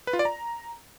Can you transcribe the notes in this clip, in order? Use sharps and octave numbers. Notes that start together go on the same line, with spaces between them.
B4
F4
D5
A#5